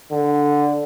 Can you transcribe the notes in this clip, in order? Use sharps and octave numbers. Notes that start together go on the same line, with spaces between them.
D3